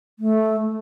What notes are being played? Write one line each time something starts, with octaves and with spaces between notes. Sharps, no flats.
A3